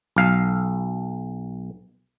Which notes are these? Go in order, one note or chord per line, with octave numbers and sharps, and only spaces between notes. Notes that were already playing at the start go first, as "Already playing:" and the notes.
B1 F5